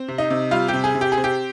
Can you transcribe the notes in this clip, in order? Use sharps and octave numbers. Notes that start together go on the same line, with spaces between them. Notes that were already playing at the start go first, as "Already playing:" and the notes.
Already playing: C4
C3
D#4
C3
G3 F4
G4
C3
G#4
C3
G4
G#4
C4
G4